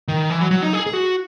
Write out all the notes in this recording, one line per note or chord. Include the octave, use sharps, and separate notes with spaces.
D#3
E3
F#3
F#3
D#4
G#4
G#4
F#4